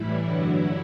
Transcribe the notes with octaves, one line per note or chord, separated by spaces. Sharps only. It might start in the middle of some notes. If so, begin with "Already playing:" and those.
Already playing: A2 E3 G3 E4
G2 D3 F#3